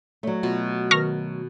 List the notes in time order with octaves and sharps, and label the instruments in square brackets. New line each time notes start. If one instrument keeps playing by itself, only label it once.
[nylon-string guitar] F#3 A3 [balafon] C#5 D5
[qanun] B2 [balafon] F4
[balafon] D#3 A#4 B4 [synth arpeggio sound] C#6 F6 A#6